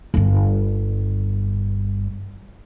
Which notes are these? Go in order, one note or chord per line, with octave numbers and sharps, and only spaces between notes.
G1 G2